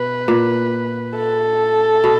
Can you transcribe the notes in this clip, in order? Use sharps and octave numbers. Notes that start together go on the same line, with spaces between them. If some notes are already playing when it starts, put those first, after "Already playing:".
Already playing: B2 B4
A#2
A4
B2